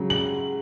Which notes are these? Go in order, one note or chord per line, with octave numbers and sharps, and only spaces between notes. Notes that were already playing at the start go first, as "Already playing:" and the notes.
Already playing: C#3 F#3
F#7